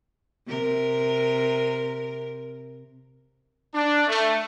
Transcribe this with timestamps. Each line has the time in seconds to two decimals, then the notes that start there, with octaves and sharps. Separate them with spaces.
0.47 C3 A#4
3.73 D4
4.07 A3